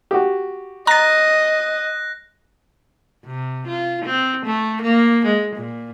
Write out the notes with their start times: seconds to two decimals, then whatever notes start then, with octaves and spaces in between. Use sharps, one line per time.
0.11 F#4 G4
0.87 D#5 A#5 F#6 A6 A#6
3.26 C3
3.67 F4
4.05 C4
4.46 A3
4.82 A#3
5.26 G#3
5.56 A#2